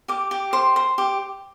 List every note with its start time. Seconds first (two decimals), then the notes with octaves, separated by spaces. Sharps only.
0.08 G4 D6
0.31 G4
0.53 C5
0.76 C5
0.98 G4